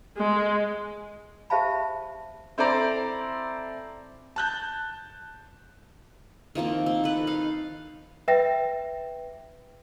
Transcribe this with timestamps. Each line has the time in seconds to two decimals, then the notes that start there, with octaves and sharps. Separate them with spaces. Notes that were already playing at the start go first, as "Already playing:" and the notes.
0.17 G#3
1.50 G4 C5 E5 F5 A5 B5
2.58 C4 E4 A4 C5 D5 A#5
4.36 A5 F#6 G6
6.55 D#3 F3 A#3 C4
6.86 C4
7.04 A4 B4
7.27 D#4 F5
8.28 B4 E5 G5 A#6